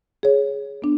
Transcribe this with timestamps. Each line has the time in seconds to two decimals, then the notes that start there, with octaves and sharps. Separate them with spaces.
0.23 G#4 C#5
0.82 B3 D4